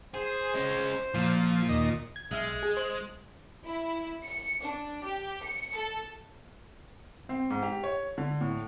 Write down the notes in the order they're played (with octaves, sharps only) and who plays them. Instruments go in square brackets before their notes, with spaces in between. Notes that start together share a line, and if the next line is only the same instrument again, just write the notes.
[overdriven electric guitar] G#4 [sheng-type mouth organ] C5
[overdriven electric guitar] G#3 C#4
[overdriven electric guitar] A#2 [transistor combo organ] F3
[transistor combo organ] D#2 D#5
[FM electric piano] G#6
[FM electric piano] B1 E5 F6 [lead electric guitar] G#3
[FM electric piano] G#4
C5
[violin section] E4
C#7
D4
G4
C#7
A4
[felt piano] C4
G#2
G4
C#5
D3
A2